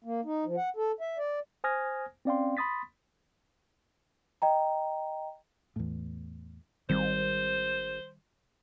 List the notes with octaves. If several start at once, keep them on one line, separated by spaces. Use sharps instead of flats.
A#3
D#4
F3
F#5
A4
E5
D5
C5 G#5 D#6 F6 G#6 A#6
C4 C#4 D5 F5 G5 C6
B5 C6 D#6 A6 B6
D#5 G5 A#5
E2 A2
G#1 D#3 G3 C4 C5